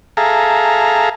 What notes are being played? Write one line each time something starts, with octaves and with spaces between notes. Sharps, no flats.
G#4 A4 E5 F5 A#5